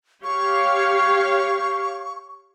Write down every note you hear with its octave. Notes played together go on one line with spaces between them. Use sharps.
G4 C#5 F5 C#6